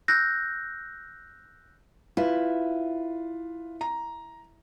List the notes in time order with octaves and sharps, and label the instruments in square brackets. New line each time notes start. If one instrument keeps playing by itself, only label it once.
[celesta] E6 F#6 G6 A#6
[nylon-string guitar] E4 [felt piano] F4 B4
[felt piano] A#5